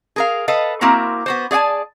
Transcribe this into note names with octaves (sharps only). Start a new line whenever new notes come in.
G#4 A#4 F5
A4 B4 D#5 F5
A#3 C4 E4 F#4 A#4
B3 F#4 C5
G#4 D5 F#5 G#5 A5